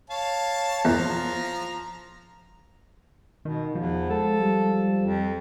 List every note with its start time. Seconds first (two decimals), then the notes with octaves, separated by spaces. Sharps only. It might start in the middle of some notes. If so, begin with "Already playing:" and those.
0.10 C#5 F5 A5
0.85 E2 F3 A#5
3.45 B2 D#3
3.75 E2 F3
4.10 G#3 A4
4.40 G3
5.00 F2